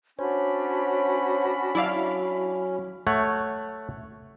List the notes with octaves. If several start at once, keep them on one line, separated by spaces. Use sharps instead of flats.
C#4 D4 F#4 C5 C#5 B5
F#3 E4 D5 F5
A3 C#5 F#5